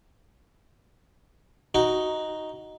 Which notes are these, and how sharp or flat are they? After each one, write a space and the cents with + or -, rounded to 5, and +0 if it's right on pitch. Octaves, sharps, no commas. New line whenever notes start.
D#4 +5 F#4 +0